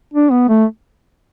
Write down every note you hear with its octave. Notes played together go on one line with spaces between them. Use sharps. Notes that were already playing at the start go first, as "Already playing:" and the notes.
D4
B3
A3